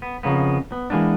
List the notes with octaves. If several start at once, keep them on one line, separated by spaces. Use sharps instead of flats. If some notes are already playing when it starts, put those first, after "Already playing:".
B3
F2 A#2 C#3 A#3 B3
B3
E3 G#3 A#3 B3 D4